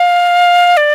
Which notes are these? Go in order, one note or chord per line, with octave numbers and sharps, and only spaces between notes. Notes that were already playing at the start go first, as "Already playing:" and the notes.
Already playing: F5
D5